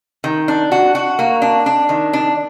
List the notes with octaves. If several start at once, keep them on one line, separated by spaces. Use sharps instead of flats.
D#3
D4
F#4
F#4
A#3
D4
D4
D#3
D4